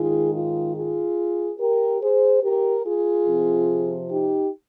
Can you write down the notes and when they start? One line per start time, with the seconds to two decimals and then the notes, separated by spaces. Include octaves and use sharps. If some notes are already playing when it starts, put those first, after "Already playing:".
Already playing: G#2 D#3 G#3 D#4 F4 G#4
0.33 F4
0.75 F4 G#4
1.59 G4 A#4
2.01 G#4 C5
2.42 G4 A#4
2.84 F4 G#4
3.26 C3 F3 C4
4.10 D#4 G4